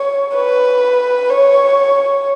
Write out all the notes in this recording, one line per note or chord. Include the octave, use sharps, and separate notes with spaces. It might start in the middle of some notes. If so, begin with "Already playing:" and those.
Already playing: C#5
B4
C#5